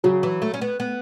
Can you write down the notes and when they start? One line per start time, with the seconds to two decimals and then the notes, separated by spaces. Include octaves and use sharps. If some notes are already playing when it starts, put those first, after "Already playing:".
0.04 C#3 F#3
0.23 E3
0.42 A3
0.54 C#4
0.62 B3
0.80 B3